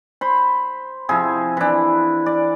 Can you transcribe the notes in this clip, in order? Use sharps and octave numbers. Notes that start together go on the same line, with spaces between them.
C5 B5
C3 F3 E4 G#4
E3 D4
D5